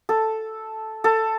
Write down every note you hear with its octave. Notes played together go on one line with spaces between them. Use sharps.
A4
A4